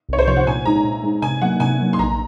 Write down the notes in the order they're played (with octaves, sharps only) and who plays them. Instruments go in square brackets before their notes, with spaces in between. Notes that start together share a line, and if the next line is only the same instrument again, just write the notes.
[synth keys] C2 [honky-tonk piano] C#5
[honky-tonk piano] C5
[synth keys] C3 F3 [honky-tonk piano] C#5
[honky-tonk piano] F#5
[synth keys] A#2 [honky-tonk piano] G#5
[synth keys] G#3 D#4 [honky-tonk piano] A#5
[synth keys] A#2
G#3 D#4
[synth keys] C3 [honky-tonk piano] G#5
[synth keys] F#3 A#3 [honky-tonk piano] F#5
[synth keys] C3 [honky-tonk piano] G#5
[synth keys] F#3 A#3
[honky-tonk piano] C6
[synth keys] A#1 [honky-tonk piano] A#5